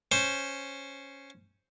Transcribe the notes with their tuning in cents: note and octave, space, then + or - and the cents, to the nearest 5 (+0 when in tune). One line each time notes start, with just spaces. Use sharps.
C#4 +0 C5 +0